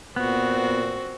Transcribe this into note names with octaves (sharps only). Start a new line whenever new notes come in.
A#2 B3 C4 F#4